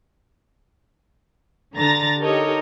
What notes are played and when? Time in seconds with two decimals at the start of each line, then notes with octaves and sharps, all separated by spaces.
1.77 D3 A#5 A6 A#6
2.21 D#4 G4 A4 A#4 C#5 D#5